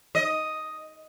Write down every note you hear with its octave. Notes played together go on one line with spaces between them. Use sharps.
D#5